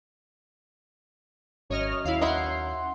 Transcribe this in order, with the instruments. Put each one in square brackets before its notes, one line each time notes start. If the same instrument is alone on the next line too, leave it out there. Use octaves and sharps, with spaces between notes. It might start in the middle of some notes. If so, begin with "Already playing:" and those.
[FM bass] G#1 [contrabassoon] F#2 [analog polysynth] C#5 D#5 F6
[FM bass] D#2 [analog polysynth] E4 F5
[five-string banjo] D#4 E4 [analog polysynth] F#5 C6